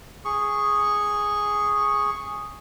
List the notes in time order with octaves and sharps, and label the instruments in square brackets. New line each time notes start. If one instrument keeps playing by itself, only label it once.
[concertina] G#4 C#6